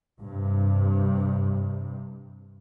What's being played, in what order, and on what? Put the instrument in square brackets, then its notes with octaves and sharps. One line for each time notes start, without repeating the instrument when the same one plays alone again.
[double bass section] G2 C3